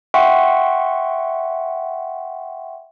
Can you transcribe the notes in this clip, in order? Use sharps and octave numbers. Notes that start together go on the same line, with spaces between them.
E5 F#5 G5 C6 C#6